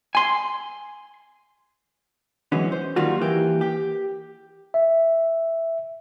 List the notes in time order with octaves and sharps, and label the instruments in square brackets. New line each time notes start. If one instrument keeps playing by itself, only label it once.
[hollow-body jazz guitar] G#5 C6
E3 F#3 G#3 B3 C#4
C5
D#3 F#3 G3 A#3 F4 F#4
E3 A#3 G4
G4
[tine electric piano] E5